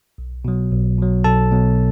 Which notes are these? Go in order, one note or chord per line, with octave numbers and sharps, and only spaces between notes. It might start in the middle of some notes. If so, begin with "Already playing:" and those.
B1
B2 F#3
B1
B2 F#3
B1 A4 A5
B2 F#3